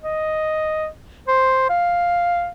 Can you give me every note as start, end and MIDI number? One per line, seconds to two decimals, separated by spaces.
0.02 0.87 75
1.28 1.67 72
1.70 2.50 77